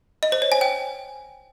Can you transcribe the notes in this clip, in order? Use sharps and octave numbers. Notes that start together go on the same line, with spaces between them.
D#5
C5
C#5
G#5
G5